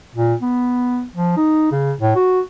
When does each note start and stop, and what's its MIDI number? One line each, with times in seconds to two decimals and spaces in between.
0.16 0.34 46
0.41 1.04 59
1.15 1.33 53
1.37 1.70 63
1.72 1.92 49
2.01 2.14 45
2.15 2.40 66